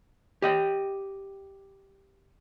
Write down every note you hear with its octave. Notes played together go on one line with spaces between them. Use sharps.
G4 D#5 G5